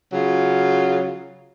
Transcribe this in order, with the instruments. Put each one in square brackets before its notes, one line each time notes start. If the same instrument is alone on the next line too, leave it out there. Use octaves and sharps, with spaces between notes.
[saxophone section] C#3 F#3 F4